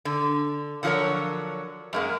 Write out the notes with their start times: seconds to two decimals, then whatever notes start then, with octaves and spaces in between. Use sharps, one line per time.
0.05 D3
0.83 D3 F3 F#3 E4 A#4 C#5
1.93 F#2 G#3 A#3